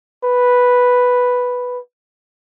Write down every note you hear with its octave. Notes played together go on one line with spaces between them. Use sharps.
B4